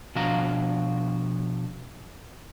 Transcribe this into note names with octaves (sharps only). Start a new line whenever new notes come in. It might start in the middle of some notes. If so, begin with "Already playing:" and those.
B2 F3 D4 F#4 F5 A#5